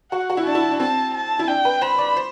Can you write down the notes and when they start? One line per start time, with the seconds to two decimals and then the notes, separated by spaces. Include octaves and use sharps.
0.12 F#4 F#5
0.30 F#4
0.37 E4
0.46 D4 A5
0.55 E4
0.71 D4
0.80 C4 A5
1.14 A5
1.39 E4
1.48 D4 G5
1.65 B4
1.81 C5 B5
1.99 D5
2.16 C5